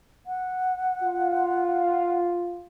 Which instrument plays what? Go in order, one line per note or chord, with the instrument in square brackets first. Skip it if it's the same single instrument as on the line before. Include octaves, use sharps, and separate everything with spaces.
[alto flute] F#5
[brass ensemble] F4